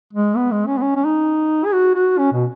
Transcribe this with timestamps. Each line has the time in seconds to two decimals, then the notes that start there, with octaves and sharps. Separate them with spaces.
0.13 G#3
0.36 B3
0.51 G#3
0.67 C#4
0.77 B3
0.82 C#4
0.96 C#4
1.04 D#4
1.65 G#4
1.72 F#4
1.95 F#4
2.18 C#4
2.32 B2